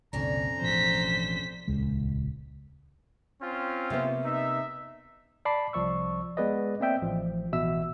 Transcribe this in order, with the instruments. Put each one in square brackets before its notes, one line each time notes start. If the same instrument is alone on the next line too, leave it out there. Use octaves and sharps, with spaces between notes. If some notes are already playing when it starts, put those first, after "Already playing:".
[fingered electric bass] C2 A#2 D3 [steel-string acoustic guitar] F2 C#4 D4 [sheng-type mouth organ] A#5
[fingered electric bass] A1 B2 F3 [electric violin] C5 B6
[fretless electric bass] D#1 C#2 G#3
[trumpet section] C4 C#4 F4
[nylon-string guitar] C3 A#3 B3
[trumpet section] D#4 E5
[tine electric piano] D5 A5 B5 D6 C7
C2 F3 D5 C#6 E6
G#3 B3 G#4 B4 D5 D#5
A#3 C4 D5 E5 G5
A1 F3
A1 B2 E3 E5 E6